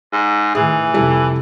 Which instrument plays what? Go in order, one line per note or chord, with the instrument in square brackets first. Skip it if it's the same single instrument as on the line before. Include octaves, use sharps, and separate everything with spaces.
[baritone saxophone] G#2
[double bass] A2 D#3 [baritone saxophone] E3 [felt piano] G#4
[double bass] F2 C3 [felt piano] G3 E4 A4